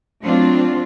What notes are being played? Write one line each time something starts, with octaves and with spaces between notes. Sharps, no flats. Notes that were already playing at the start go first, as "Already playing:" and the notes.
F#3 A3 C4 D4 F4